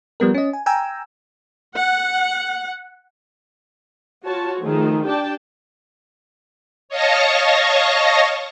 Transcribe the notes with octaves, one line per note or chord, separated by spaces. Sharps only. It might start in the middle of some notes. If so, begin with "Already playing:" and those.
F3 G3 B3 A#4
C#4 D#5
G#5
G5 G#5 A#5 E6
F#5
F4 F#4 C#5 A5
D#3 F3 A3 G#4
D4 G4 D5 G5 A5
C#5 D#5 F5 A5 C#6 A#6